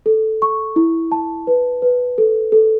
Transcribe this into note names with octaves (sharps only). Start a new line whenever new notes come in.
A4
C#6
E4
A5
B4
B4
A4
A4